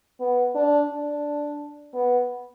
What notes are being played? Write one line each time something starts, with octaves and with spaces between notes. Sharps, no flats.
B3
D4
D4
B3